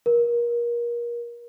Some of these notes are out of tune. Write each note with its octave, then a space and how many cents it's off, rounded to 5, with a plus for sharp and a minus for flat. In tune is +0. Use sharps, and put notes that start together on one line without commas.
A#4 +30